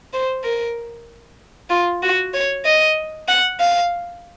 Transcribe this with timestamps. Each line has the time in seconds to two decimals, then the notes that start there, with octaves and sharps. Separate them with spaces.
0.13 C5
0.44 A#4
1.70 F4
2.02 F#4
2.34 C#5
2.65 D#5
3.28 F#5
3.60 F5